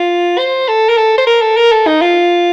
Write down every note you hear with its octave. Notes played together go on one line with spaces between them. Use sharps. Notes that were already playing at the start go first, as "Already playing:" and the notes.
Already playing: F4
C5
A4
A#4
A4
C5
A#4
A4
A#4
A4
D#4
F4